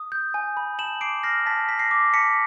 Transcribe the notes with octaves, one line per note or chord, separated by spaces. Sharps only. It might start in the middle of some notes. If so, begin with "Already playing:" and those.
Already playing: D#6
G6
G#5
B5
A5 E7 F#7
D6 C7 D7
F6 A#6 C7
A5 A6 B6
A5 B6
A#6 C7
D6
A5 B6 C#7